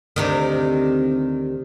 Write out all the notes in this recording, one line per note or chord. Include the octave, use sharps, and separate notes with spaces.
D2 C3 D#3